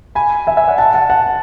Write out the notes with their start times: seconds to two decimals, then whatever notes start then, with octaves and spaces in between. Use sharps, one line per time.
0.15 G#5 B5
0.47 E5 G#5
0.57 E5 G#5
0.68 D5 F#5
0.78 F#5 A5
0.94 F#5 A5
1.10 F#5 A5